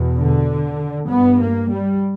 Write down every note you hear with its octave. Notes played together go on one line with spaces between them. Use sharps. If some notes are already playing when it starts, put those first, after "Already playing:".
Already playing: E2 B2
D3
G2 B3
A#3
G3